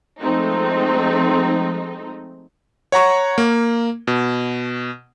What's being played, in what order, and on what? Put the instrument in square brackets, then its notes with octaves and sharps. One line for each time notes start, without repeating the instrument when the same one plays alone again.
[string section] F3 G#3 A3 C4 D#4
[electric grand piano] C#5 F#5 A#5 C#6
A#3
B2